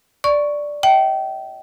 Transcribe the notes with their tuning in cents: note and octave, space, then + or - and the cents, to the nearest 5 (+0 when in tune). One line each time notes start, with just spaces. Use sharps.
D5 +0 C#6 +0
E5 -40 G5 -30